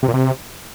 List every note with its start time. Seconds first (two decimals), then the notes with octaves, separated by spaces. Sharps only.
0.03 C3
0.08 A#2
0.14 C3